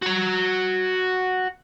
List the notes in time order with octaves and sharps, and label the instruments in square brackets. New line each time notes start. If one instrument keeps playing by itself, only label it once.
[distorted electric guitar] F#4 A#5